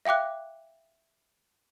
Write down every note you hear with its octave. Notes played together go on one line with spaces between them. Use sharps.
E5 F5 G5 D6 F#6